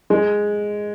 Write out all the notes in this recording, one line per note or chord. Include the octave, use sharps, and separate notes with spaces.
G#3